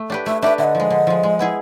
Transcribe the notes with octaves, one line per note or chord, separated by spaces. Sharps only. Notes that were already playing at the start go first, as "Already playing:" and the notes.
Already playing: A3
D4 G4 B4
A3 E5
D4 G4 B4 E5
D3 E5
D#5
F3 G#3
D3
F3 G#3
G#3
B3 E4 G#4